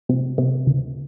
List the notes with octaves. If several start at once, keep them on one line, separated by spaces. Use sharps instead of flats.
C3
C3
D2